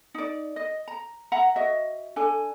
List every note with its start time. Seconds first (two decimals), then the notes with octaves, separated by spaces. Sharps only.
0.14 D#4 D5
0.56 D#5
0.88 A#5
1.32 E5 F#5 A#5
1.56 F#4 D#5 E5
2.16 D4 A4 G#5